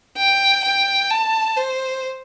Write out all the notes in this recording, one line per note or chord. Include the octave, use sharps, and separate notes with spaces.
G5
G5
A5
C5